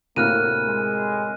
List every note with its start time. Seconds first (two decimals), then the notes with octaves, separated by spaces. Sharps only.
0.16 D2 A2 C3 A#3 A#4 F6 F#6 D#7
0.67 G#3